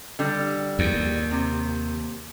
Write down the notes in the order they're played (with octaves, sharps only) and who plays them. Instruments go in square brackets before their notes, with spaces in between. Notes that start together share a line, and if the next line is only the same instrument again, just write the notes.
[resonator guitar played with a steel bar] D3 G3
[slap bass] D#2
[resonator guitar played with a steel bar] C3